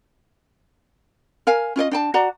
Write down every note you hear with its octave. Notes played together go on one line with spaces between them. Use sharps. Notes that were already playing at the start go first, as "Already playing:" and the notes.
A#4 F5 G#5
C#4 F4 D5 D#5
D4 G5 A5
F#4 D5 A#5